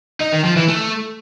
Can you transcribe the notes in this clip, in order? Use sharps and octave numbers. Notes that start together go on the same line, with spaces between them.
D#4
D#3
F3
E3
A3